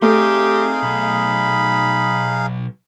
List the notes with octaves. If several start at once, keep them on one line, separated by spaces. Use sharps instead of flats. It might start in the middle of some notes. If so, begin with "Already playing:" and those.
A3 C4 D#4 G4 G#4 F5 C6
B1 B5